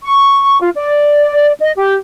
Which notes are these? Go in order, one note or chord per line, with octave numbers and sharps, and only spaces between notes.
C#6
F4
D5
D#5
G4